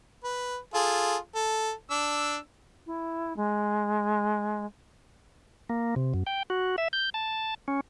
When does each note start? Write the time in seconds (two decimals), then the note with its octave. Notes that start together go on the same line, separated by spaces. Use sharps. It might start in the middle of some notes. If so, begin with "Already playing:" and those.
0.24 B4
0.74 F4 G#4 A4
1.35 A4
1.91 D4 E6
2.86 E4
3.36 G#3
5.70 A#3
5.96 C3
6.14 F#2
6.27 G5
6.50 F#4
6.78 E5
6.93 G6
7.14 A5
7.68 C#4